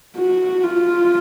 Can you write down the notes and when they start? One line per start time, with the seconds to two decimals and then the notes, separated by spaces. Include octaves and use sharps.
0.17 F#4
0.63 F4